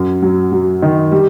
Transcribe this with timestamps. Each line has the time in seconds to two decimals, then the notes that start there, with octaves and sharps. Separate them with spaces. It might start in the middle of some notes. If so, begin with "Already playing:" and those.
Already playing: F#2
0.22 F#3
0.52 F#3
0.82 D#3
1.12 G3